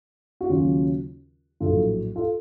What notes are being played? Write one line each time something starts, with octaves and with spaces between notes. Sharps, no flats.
F#4
D#2 C#3 F#3 C#4 F4
A#1 A2 F#3 F4 A4
F4 A4